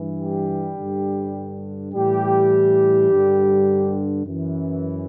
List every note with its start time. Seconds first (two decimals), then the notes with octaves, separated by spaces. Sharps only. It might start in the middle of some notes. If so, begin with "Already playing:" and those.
Already playing: G2 E3
0.18 G3 G4
0.77 G2 D3
1.93 A2 E3 G3 G4
3.10 G2 D3
4.26 F#2 E3